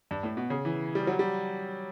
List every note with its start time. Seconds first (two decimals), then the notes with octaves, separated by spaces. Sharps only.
0.11 G2
0.23 A2
0.37 B2
0.50 C#3
0.65 E3
0.95 G3
1.07 F#3
1.19 G3